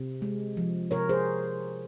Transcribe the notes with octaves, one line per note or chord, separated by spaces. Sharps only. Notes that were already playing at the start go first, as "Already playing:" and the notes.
Already playing: C3
G#3
F3
C3 A#4 C#5
G#4 C5